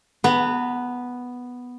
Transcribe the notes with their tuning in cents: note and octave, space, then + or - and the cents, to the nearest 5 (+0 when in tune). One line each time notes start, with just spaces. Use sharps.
B3 +0 A#5 -35